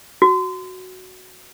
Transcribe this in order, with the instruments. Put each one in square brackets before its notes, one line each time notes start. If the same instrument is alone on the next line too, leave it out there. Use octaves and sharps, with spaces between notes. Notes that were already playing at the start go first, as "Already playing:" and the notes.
[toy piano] F#4